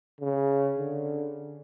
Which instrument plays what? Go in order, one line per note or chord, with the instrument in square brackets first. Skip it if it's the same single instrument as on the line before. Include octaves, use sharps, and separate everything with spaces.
[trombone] C#3
D3